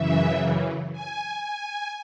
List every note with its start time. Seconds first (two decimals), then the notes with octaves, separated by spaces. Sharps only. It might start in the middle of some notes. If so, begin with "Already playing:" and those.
Already playing: F#2 C#3 E3 E5
0.93 G#5
1.43 G#5